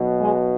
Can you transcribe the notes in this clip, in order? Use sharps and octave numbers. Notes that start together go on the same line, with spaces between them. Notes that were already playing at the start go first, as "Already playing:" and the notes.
Already playing: B1 B2
G#3